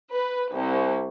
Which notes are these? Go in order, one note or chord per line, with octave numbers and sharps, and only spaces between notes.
B4
C2